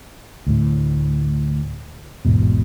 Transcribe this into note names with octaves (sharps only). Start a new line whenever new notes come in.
D2 A2
A1 E2 G#2 B2